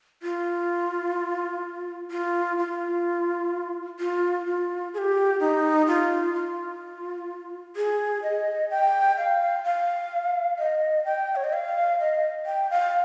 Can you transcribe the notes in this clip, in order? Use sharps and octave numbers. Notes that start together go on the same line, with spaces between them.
F4
F4
F4
F4
F4
G#4
G4
D#4
F4
F4
G#4
D#5
G5
F5
F5
D#5
G5
C#5
D#5
F5
D#5
G5
F5